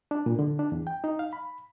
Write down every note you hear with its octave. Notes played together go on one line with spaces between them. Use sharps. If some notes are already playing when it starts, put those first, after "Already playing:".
D4
A#2
D3
D4
E2
G5
D#4
F5
B5